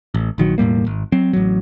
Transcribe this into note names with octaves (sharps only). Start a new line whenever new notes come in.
A1
A#1 D#3 F#3
E1 A2 G3 A#3
G#1
F#3 C4
A1 F#3